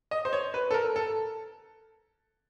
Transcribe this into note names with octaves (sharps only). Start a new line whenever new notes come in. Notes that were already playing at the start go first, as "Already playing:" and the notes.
D#5
C5
C#5
B4
A4
A#4
A4